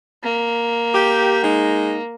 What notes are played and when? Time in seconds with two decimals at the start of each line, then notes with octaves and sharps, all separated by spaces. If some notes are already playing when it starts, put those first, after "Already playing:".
0.24 A#3
0.94 G4
1.43 G#3 D#4